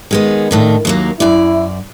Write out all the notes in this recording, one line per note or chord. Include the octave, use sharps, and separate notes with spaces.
D#3 G#3 B3
A2 D#3 D4
D#2 F#3 A#3
F#2 E4 D5